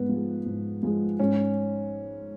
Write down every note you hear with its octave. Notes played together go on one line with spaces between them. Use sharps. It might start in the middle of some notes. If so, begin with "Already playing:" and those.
Already playing: G#2 B3
F3 G#3
G#2
F3 G#3
G#2 C#4